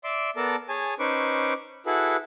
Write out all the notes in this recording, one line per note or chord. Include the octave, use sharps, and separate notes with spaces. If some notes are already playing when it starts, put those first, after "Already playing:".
D5 E5 C6 D6
B3 A4 A#4 D5 A5
G#4 C#5 G#5 A5
C#4 D#4 B4 C5 C#6 D6
E4 F#4 G#4 A4 B4